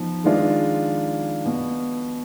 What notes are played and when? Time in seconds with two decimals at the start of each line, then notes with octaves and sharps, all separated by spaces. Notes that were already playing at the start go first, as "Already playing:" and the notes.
Already playing: F3 B3 D#4
0.24 D#3 G#3 D4 F4
1.45 B2